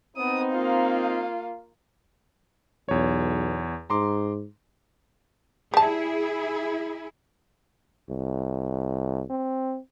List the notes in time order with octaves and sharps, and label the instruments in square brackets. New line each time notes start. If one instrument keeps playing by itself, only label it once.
[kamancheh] B3 D#6 [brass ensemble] C4 D#4
[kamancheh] A#3 F4
[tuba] B1 [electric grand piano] E2 C#5
[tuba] G#2 [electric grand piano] A#5 C6 D6
[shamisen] G3 A5 [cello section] E4 G#4
[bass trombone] C2
C4